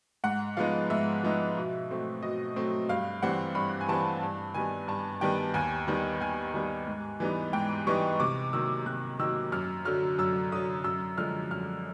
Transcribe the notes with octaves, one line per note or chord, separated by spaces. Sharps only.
G#2 F#5
F3 G#3 B3 D#4 F5
G#2 E5
F3 G#3 B3 D#4
B2
F#3 A3 C4
B2 D#5
F#3 A3 C4
G2 F5
E3 G3 C4 F#5
G2 B5
G#5
E3 G3 C4 A5
G2
D#3 G3 B3 G#5
G2 A5
D#3 G3 B3 G5
D#2 G#5
D#3 G3 B3 D#4
D#2 G#5
D#3 G3 B3 D#4
G#2
E3 G3 B3 D#4
G#2 G5
E3 G3 B3 D#4 C#6
C3 D6
D#3 F#3 A#3 E6
C3 F#6
D#3 F#3 A#3 E6
F#2 F6
D3 F#3 F6
F#2 E6
D3 F#3 D#6
F#2 E6
D3 F3 G#3 F6
F#2 F6